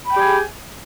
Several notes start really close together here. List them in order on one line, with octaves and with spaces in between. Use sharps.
B5 G5 G4 G#5 G#4